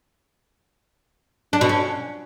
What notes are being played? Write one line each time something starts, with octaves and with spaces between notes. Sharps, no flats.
D4
B2
C#4